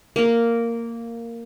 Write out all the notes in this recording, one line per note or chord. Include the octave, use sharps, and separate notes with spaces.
A#3 A#4